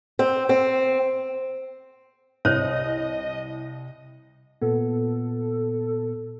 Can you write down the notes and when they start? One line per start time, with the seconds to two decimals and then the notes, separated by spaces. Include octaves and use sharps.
0.19 C4
0.49 C4
2.45 C2 E4 C5 C#5 D#5
4.62 A#2 B3 A4